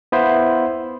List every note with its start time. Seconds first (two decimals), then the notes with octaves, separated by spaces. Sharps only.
0.12 B3 E4 C5 F5